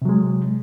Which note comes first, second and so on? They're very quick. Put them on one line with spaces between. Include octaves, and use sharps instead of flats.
C3 F#3 G#3